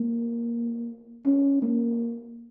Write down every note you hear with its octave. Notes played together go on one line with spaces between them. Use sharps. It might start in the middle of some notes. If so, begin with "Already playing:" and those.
Already playing: A#3
C#4
A#3